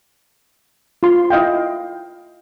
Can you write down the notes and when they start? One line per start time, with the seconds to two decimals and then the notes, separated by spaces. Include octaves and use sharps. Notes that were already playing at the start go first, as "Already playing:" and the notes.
1.03 F4 C6
1.30 E4 D#5 F5 G5